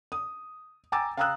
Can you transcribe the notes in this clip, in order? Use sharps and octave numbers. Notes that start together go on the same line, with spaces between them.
D#6
G5 G#5 A#5 D6 E6 A6
F5 G5 A#5 D#6 E6 F#6